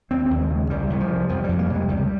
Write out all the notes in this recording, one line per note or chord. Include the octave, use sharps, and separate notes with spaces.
D#2 C4
D#2 C4
G#3
C#3 G#3 A#3
C2 G3
C2
F3
C3
F2 F3
F2 G3
A#3
G3
C3 G#3
C#2 G3